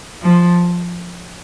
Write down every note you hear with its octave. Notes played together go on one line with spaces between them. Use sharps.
F3